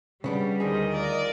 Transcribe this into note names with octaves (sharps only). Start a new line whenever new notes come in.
C#3 G3 B3 D4
D2 D#3 G#4 C5 D#5
F4 A#4 D5